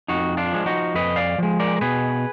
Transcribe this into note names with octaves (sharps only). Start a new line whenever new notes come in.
F2 D#4 F#4
D4 F4
F3 G#3
D#4 F#4
F2 B4 D#5
D5 F5
F3 G#3
A#4 D5
A#4
B2 G#4 B4